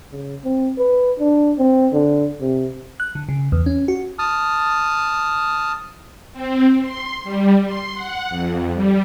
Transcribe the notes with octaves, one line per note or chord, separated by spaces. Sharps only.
C#3
C4
B4
D4
C4
D3
C3
F#6
D3
C#3
E2
C#4
F#4
A5 D#6 F6
C4
C6
G3
C6
F#5
F2
G3